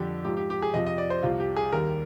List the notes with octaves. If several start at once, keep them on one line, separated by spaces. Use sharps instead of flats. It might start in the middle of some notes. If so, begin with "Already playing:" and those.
Already playing: F2 D3 G3 G4
G#2 F3 G4
G4
G4
G#4
F2 C3 F3 D#5
D#5
D5
C5
C2 C3 F3 F4
G4
G#4
D#2 D#3 G3 A#4